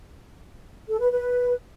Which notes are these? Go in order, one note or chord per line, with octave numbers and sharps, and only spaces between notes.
A4
B4
B4